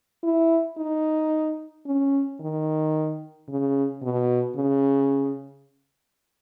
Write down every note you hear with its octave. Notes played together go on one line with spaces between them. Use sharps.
E4
D#4
C#4
D#3
C#3
B2
C#3